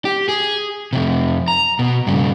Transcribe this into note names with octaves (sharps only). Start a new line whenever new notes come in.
G4
G#4
F2 C3
A#5
B2
G2 C#3